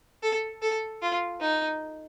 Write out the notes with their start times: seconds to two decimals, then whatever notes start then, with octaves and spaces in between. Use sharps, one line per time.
0.23 A4
0.62 A4
1.02 F4
1.40 D#4